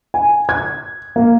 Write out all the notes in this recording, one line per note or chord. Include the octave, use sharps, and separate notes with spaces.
G#5
G#6
A#3